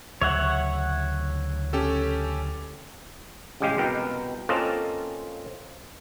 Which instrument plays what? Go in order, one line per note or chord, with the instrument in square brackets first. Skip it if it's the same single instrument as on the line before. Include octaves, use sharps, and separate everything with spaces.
[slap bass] D2 C#3 F#3 [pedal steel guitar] C#5 E5 F#5
[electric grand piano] C#4 G4 A4
[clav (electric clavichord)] A1 C#3 G#3 G4 F5 G5
C2 B2 A#4 G5
A#3 C4 C#4 F4 A4 D#5